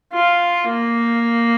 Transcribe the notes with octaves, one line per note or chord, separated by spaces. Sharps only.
F4
A#3